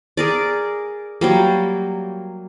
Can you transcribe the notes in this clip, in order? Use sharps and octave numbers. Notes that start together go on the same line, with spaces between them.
G#4 A#4 D5
F#3 G3 A#3